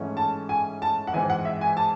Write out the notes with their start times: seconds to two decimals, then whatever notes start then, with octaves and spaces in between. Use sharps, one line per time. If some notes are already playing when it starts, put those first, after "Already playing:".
Already playing: G#2 E3 A3 C#4 E4
0.17 A5
0.49 G#5
0.82 A5
1.07 F#5
1.13 G#2 E3 C4 G#5
1.30 F#5
1.45 E5
1.61 G#5
1.77 A5